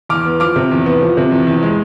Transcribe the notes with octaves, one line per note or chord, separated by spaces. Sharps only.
E2 D6 F6
B3
F3 D6 F6
C3
E2
B3
F3
C3
E2
E2
G#3